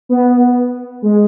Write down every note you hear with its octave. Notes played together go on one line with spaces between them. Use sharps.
B3
G#3